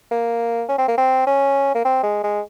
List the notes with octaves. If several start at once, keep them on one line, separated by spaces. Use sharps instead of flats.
A#3
C#4
C4
A#3
C4
C#4
A#3
C4
G#3
G#3